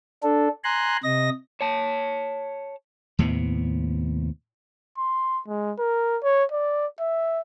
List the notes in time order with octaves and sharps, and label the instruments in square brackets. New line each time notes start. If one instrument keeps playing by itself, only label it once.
[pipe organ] D4 A4
G#5 A#5 C6 F#6
C3 D#5 A#6
[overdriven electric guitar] C#5 A5
[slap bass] D#2 A2 C3 B3
[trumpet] C6
G#3
A#4
C#5
D5
E5